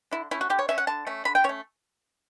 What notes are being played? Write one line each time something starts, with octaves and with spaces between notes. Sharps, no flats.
D3 E4
A3 C#4 E4
F#4
D3 G4
C#5
A3 C#4 E5
F#5
D3 A5
A3 C#4
D3 B5
G5
C#4 C#5
A3